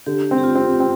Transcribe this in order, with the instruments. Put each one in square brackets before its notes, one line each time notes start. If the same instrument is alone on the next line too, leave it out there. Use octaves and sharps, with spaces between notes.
[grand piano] D3 [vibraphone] G4
[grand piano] C4
[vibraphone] G4
F4
[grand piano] C4
C4